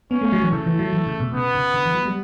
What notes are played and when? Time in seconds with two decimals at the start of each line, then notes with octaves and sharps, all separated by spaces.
0.11 B3 C#4
0.21 A3
0.32 F#3
0.42 E3
0.52 C#3 A3
0.66 E3
0.79 F#3
0.93 E3
1.06 C#3
1.20 B2
1.34 C#3 B3
1.55 C#3
1.74 D3
1.86 E3
1.95 F#3
2.06 G3